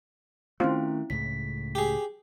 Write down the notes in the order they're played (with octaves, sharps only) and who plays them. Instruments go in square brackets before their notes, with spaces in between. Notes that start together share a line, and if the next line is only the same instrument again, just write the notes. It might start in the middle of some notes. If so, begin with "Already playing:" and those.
[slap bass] D#3 A3 [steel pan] C4 F4 [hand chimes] C#4 E4
[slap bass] C#2 A2 C#3 [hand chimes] B6
[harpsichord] G4 G#4